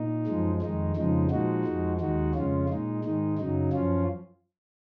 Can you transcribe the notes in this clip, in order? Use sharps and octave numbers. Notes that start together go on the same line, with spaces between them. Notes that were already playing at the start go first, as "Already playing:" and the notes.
Already playing: A#2 D#4
F#2 F3 G#3
F2 D#3 G#3 D#4
F2 C#3 F3 G#3 D#4
A#2 F3 G#3 D#4 F#4
F2 F3 G#3
D#2 D#3 G#3 D#4 F#4
F2 C#3 G#3 C#4 F4
A#2 G#3 D#4
G#2 D#3 G#3 D#4
F#2 C#3 F#3 D#4
F#2 F3 C#4 F4